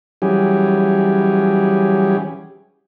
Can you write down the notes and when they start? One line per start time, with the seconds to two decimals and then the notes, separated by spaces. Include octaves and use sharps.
0.22 E3 F#3 G3 C#4 G4 G#4